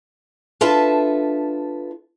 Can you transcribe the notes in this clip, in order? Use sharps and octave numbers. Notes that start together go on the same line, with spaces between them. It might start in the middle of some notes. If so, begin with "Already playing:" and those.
D4 F4 A4 B4 E5 A5